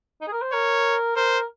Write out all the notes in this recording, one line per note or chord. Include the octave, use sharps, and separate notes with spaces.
D#4
G#4
A#4
C5
A#4 C#5
A#4 C5